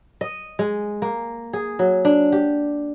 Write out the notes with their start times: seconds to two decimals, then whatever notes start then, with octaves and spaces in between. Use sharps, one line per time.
0.21 D#5
0.59 G#3
1.02 A#3
1.53 G#4
1.79 F#3
2.05 D4
2.32 G4